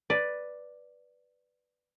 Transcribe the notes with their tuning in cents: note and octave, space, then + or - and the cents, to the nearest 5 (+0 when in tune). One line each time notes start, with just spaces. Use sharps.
B4 +0 D5 +5